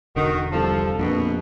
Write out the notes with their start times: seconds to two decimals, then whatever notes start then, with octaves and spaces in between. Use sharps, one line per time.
0.16 E1 D3 D#3 F#4
0.52 C2 F3 A4
0.99 A#1 F2 B2